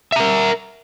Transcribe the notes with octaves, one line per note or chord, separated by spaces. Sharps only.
A#4 E5 A#5